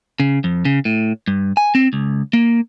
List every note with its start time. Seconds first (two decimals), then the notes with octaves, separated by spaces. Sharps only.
0.20 C#3
0.44 F2
0.65 C#3
0.85 A2
1.28 G2
1.57 G#5
1.75 C4
1.93 C#2
2.33 A#3